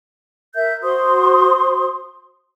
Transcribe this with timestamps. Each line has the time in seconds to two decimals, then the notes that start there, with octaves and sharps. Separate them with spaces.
0.55 A#4 E5 G6
0.83 F#4 C5 C6 D#6